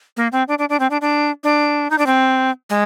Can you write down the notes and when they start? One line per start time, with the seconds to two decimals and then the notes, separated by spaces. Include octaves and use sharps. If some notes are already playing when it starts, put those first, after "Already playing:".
0.17 A#3
0.32 C4
0.48 D4
0.59 D4
0.69 D4
0.80 C4
0.90 D4
1.01 D4
1.44 D4
1.91 D#4
1.98 D4
2.06 C4
2.70 G#3